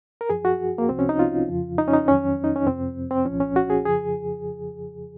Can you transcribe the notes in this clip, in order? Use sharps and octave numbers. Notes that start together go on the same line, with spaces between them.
A#4
F#2 F3 G#4
F#4
A#3
C2 C3 F3 C4
C#4
D#4
F4
F2 C#3 F3
D#4
C#4
D#4
F2 D#3 F#3 C#4
D#4
C#4
F2 C3 F3 C4
C4
C2 A#2 F3 C#4
C#4
F#4
G#4
F2 C#3 F3 G#4